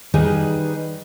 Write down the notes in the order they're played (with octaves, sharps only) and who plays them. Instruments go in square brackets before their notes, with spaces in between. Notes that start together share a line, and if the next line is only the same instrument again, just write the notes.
[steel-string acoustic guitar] D#3 G3 D#4 G#4 B4